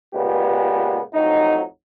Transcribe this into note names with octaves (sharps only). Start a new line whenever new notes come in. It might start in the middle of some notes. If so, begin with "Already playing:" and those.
C#2 A#2 B3 G4 B4
A1 F2 F#3 D#4